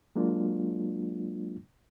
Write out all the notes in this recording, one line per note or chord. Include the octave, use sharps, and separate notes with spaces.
F#3 G#3 A#3 D4 F4